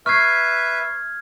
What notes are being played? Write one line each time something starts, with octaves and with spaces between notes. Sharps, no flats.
B4 E5 C#6 F6 G#6 C7